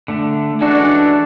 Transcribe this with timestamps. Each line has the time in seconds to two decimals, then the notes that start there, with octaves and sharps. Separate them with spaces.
0.08 D3 A3 D4
0.61 E3 G#3 C#4 D4 F#4 A4